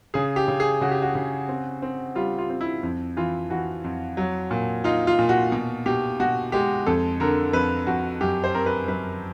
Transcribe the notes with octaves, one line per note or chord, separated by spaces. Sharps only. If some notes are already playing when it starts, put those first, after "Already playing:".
C#3 G#4
G4
C#3
G#4
C#3 F#4
G4
F#4
C#3
C4
C4
G3 F4
F4
C4
E4
F2
E3 F4
E3 F#4
F2
F#3
A#2
D#4 F4
F4
A#2
F#4
B2
B2 G4
B2 F#4
G#3 G4
F2 A4
D3 A#4
F2 B4
F2 F#4
F#2 G4
C5
C4 A#4
B4
F#2 B4